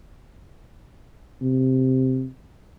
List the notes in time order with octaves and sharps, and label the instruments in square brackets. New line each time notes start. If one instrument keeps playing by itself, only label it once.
[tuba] C3